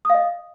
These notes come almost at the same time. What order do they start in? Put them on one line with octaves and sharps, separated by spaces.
D#6 F5 D#5